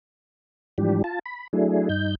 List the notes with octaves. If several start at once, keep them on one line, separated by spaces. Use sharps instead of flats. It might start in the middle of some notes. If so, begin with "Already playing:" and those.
G#2 E3 F3 G3 D4 G4
F4 A5
B5
F#3 A3 D4 E4 G#4
G2 D#4 G6